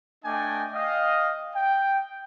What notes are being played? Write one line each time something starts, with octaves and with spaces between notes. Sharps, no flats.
A3 D4 D5 D#5 G5 G#5
D#5 F5 G5
G5